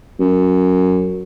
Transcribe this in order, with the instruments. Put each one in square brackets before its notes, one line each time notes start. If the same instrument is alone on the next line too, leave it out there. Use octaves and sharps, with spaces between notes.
[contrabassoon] F#2